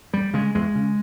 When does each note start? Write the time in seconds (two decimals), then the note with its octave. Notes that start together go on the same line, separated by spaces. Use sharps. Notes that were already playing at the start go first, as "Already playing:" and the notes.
0.13 E2 G3
0.34 C#3 G#3
0.55 E2 G#3
0.75 C#3